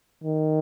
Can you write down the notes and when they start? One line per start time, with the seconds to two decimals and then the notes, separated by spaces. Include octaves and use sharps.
0.24 D#3